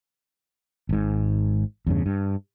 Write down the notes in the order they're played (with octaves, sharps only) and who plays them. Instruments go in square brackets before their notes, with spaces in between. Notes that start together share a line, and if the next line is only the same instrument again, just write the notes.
[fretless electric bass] G#1 G#2
E2 G2 C#3
G2